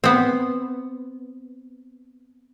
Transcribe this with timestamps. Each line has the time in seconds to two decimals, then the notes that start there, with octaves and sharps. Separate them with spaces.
0.04 B3 C4